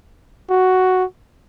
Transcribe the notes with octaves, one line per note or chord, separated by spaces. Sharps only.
F#4